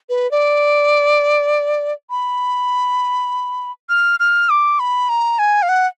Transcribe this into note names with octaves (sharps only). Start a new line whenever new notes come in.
B4
D5
B5
F6
F6
D6
B5
A#5
G#5
F5
F#5